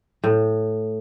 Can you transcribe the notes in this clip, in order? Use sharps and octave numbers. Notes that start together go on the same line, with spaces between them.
A2